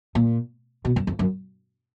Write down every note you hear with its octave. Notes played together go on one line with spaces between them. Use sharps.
A#2
B2
F#2
F2
F#2